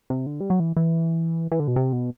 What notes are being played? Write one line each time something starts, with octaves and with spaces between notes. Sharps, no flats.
C3
D3
G3
F#3
E3
E3
E3
D3
B2
C3
B2